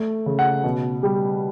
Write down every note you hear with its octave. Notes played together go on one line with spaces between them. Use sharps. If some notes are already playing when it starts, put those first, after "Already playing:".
Already playing: A3
C#3
F#5
B2
G3